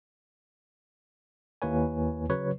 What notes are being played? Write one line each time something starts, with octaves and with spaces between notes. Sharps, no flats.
D#2 A#3 E4 B4 C#5 G#5
C#3 F#3 B4 C#5